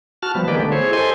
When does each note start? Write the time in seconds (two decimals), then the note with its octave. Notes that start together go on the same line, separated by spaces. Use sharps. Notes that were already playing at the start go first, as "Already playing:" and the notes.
0.23 F#4 A5 F6
0.35 F3 G3 B3
0.48 D#3 G#3 A#3 G4 B4 D5
0.60 D3 A3 B3
0.72 E4 G#4 C5 C#5
0.93 G4 A4 C5 D#5 G#5 C6